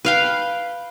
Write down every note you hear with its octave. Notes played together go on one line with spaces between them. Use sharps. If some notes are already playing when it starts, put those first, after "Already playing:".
B4 F5 G5